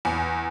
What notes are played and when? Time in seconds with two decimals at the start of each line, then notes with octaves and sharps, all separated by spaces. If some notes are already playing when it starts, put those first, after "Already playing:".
0.05 E2